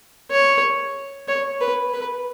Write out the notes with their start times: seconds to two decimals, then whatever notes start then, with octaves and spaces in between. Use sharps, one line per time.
0.31 C#5
1.28 C#5
1.60 B4
1.93 B4